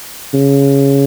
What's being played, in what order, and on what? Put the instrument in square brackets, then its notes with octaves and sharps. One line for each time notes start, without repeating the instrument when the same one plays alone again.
[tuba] C#3